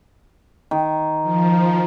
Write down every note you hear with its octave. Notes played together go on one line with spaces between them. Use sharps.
D#3
F3